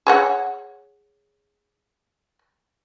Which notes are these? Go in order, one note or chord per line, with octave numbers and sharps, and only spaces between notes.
G#4 C#5 F#5